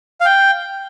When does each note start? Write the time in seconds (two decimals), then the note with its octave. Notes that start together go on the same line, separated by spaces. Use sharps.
0.21 F5
0.25 G5